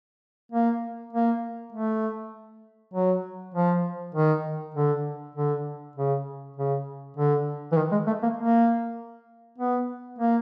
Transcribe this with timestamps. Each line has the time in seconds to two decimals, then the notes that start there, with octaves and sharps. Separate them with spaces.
0.52 A#3
1.13 A#3
1.72 A3
2.94 F#3
3.54 F3
4.15 D#3
4.74 D3
5.35 D3
5.96 C#3
6.56 C#3
7.17 D3
7.72 E3
7.77 D#3
7.92 G#3
8.07 A3
8.23 A#3
8.37 A#3
9.58 B3
10.18 A#3